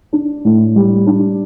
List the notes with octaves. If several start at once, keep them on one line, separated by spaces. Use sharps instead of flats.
D4
A2
G3
D4